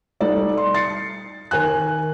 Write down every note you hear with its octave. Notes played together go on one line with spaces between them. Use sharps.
G3 D#4 A4 D5
C6
A6 C7 C#7
D#3 A#4 G#5 F#6